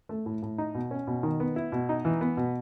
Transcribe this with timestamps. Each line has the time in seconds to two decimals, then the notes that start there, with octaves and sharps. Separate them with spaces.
0.09 A3
0.26 A2
0.42 A2
0.58 D#4
0.75 B2
0.91 C#4
1.07 B2
1.23 D#3
1.40 B3
1.56 E4
1.72 B2
1.89 D#4
2.05 E3
2.21 B3
2.37 B2